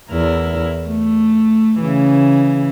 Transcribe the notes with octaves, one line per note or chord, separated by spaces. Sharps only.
E2 E4 A#4
A3
C#3 E3